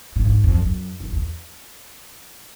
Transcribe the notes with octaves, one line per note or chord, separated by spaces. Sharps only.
A2
G#2
F2
F#2
F#2
E2